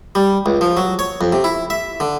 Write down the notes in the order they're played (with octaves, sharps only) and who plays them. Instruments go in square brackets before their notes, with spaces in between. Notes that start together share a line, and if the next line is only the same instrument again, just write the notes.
[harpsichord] G3
C#2
F3
F#3
C#5
F2
C3
E4
E5
D3